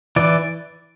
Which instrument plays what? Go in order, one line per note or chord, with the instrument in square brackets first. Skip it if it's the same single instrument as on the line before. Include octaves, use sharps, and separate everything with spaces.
[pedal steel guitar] E3 D5